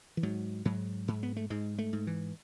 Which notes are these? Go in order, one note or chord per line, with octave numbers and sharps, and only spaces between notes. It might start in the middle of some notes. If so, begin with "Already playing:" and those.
E3
G#2 F#3
G#2 F#3
G#2
B3
A3
G#2 G#3
A3
G#2
E3